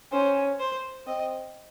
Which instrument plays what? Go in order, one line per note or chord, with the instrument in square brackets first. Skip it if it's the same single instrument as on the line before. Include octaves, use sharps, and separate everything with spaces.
[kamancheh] C#4 [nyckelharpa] C5
[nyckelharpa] C5
[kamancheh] C4 [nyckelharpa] D#5